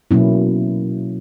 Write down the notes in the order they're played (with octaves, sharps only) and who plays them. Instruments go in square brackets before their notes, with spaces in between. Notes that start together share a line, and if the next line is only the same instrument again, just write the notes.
[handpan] B2 F#3 A#3 C#4 E4